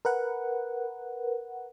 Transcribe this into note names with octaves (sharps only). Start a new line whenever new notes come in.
A#4 B4 F#5